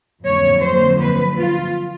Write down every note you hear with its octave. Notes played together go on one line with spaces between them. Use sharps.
F2 D3 F#3 A#3 C#5
C5
B4
F4